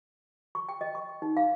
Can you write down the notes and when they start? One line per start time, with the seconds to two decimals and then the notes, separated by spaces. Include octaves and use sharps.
0.55 C#6
0.69 G5
0.81 D#5
0.95 C#6
1.22 D#4
1.37 F5